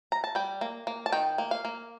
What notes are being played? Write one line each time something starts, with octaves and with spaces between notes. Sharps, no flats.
A#5
A5
G3 G5
A#3
A#3
A5
D#3 G5
A#3
F5
A#3